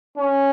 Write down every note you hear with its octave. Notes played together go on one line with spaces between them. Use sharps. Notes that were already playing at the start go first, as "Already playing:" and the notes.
C#4